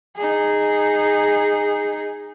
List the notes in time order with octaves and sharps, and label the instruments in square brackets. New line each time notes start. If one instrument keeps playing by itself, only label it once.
[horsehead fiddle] D#4 G#4